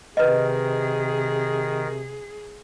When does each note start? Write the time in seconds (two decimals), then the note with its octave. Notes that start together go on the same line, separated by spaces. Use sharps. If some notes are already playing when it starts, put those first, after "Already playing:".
0.17 C3 D#3 G#4 B4 D#5